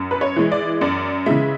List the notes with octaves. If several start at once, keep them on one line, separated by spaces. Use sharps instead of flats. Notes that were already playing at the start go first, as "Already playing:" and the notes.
Already playing: F#2
B4
C#5
E3 G#3
D5
F#2 D5
C#3 E3 G#3 E5